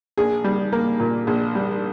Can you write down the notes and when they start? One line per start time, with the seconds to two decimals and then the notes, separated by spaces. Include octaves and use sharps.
0.18 A#1 G#4
0.44 G3
0.72 A#3
1.00 A#2
1.27 A#1
1.55 G3